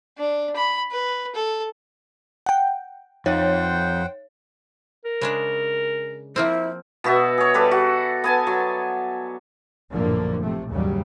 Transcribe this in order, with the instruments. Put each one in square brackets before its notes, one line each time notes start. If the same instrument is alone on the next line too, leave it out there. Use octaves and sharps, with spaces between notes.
[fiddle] D4
B5
B4
A4
[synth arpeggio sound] F#5 G5
[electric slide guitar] F2 [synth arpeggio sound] D#4 [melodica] C5 F#5 G5 [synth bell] C#5
[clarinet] A#4
[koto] C#3 G#3 D4
[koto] F3 A#3 C4 [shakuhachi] E4
[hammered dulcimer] B2 B3 F#4 E5
G#4 C#5
G3 A4 B4 D5
F#4
B3 G#5 A5
F#3
[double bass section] A#1 F#2 A2 D3 F3 A#3
C3 A3
D#2 G#2 C#3 F#3 G3